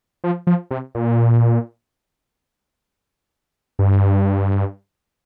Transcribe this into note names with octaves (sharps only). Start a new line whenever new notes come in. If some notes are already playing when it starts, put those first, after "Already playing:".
F3
F3
C3
A#2
G2